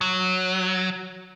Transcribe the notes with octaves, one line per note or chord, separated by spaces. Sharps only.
F#3